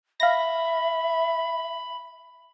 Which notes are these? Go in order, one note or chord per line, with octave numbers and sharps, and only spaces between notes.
E5 F5 B5 A#6